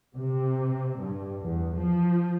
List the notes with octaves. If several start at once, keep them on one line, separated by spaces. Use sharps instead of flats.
C3
G2
E2
F3